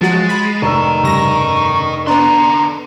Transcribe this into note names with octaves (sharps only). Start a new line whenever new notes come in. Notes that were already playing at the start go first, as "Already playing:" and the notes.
F3 F#3 G#3 F#4 A6
B5
F1 D#4 A#4 C#6 E6
G2 C#3 C#6 A#6
D3 B3 D4 A#5 C6